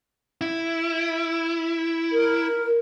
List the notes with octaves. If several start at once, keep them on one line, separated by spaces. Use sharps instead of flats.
E4
A#4